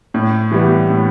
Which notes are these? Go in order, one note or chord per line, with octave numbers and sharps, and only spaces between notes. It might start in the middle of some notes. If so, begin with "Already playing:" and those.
A2
E3 G3 B3
A2